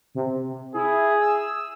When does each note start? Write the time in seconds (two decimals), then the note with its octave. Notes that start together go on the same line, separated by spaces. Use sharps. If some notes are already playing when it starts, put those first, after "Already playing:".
0.15 C3
0.74 E4 G#4
1.20 E6